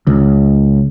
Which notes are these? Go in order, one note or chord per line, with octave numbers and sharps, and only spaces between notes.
C#2